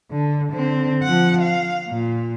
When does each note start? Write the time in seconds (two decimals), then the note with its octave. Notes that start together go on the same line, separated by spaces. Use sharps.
0.11 D3
0.52 D3 C4
1.03 F3 F#5
1.41 F5
1.88 A#2